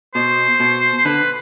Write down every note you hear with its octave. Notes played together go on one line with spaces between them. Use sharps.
B2 C5
B2
D3 B4